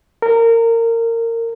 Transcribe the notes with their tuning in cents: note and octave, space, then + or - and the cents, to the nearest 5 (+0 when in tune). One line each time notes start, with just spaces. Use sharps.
A#4 -25